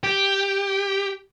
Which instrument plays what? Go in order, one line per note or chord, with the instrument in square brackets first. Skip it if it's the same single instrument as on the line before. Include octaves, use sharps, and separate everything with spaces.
[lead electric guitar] G4